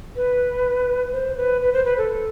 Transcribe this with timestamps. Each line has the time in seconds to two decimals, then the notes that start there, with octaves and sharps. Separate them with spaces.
0.16 B4
1.13 C5
1.37 B4
1.61 B4
1.73 C5
1.85 B4
1.98 A4